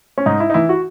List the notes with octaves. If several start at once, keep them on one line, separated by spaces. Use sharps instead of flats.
C#4
G#2 D#4
E4
D#4
E3 E4
F#4